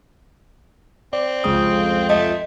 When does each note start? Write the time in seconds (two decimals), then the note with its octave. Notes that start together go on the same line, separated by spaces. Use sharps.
1.13 C4 D5
1.44 C2 F2 C#3 G#3 F4 G5 D#6
2.09 A3 D#5